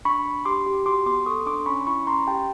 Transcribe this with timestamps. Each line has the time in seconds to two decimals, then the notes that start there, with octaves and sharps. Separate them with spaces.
0.05 D4 B5 C#6
0.26 D4
0.45 G4 C6 D6
0.66 G4
0.86 F#4 C6 D6
1.06 B3 C6 D6
1.26 A4 C#6 D#6
1.46 D4 C6 D6
1.66 C#4 B5 C#6
1.87 E4 B5 C#6
2.07 C#4 A#5 C6
2.27 G4 G5 A5